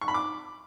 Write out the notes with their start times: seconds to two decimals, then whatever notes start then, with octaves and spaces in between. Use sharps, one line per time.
0.01 C#6
0.08 B5
0.14 D6